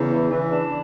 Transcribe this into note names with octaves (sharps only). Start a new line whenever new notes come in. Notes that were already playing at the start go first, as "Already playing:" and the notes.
Already playing: E2 C#3
E3
E3
D4